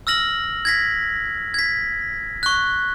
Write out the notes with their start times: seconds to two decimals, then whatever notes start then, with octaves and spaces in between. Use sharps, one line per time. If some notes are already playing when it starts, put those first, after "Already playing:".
0.07 E6 F6 A#6 F#7
0.65 G#6 A#6 B6
1.54 G#6 B6
2.43 C#6 F#6